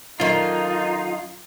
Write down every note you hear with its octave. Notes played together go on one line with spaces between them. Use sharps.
D3 D#3 F#3 C#4 D#4 F4